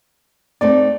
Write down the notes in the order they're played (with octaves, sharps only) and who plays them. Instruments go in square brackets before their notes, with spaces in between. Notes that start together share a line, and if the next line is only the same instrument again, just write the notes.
[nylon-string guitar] A3 C4 D#4 [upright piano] D5